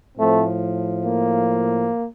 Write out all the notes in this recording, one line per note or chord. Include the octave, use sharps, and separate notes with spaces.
A2 F3 A3 C4
A#3